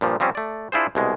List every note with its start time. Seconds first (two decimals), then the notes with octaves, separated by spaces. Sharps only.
0.01 G2 A#2 F3
0.20 F3 G3 C4 C#4
0.35 A3 D5
0.72 D4 E4 F4 G#4 C5
0.95 C2 B2 G#3